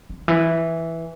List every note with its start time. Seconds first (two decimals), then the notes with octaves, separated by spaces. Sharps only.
0.09 D3
0.28 E3